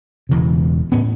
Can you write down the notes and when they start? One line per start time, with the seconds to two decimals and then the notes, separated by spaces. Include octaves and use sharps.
0.29 E1 E2 C#3
0.92 A2 B3 C#4